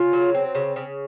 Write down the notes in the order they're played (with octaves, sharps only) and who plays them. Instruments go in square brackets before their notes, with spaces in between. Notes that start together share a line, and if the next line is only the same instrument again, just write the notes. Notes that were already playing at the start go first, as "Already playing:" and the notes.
Already playing: [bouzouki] C#3 [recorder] F4
[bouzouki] F#3
C4
C#3
C#3